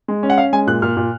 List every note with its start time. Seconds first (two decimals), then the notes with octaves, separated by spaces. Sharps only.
0.08 G#3
0.23 C#4
0.30 F#5
0.38 C#4 F5
0.53 G#3 G#5
0.67 A#2 F#6
0.82 A#2 F6
0.97 A#2